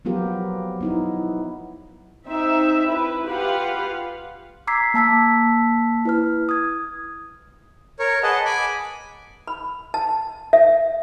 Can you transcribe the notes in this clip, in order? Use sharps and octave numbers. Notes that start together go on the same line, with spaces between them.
F3 F#3 B3 F4 G4 A#4
B3 D#4 E4
C4 D#4 E5
E4 B4
F4 G4 B4 F5 F#5
A#5 D6 E6 G#6 B6 C7
A#3 A5 E6 B6
E4 B4 F6
D#6 G#6
A#4 C#5
G#4 B4 D#5 F#5 A5
G#5 B5 D6
B5
A5
E5